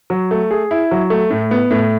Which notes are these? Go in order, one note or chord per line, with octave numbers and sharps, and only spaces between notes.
F#3
A3
G#4
E4
F#3
A3
A2
B3
A2